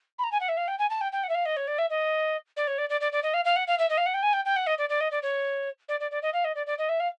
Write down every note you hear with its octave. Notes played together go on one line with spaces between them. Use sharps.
B5
A#5
G#5
F#5
E5
F5
G5
G#5
A5
G5
G5
F#5
E5
F5
D#5
C#5
D5
E5
D#5
D5
C#5
D5
D5
D5
D5
D#5
F5
F5
F#5
F5
E5
D#5
F5
F#5
G5
G#5
G5
G5
F#5
D#5
D5
D5
D#5
D5
C#5
D5
D5
D5
D#5
F5
D#5
D5
D5
D#5
E5
F5